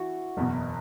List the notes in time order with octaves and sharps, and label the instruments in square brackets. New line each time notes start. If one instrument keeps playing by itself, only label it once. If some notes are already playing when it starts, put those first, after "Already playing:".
Already playing: [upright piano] E3 [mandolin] F#4
[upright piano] F#1 E2 B2